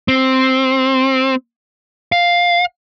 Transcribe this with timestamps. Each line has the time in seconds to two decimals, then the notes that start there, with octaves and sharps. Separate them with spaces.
0.08 C4
2.12 F5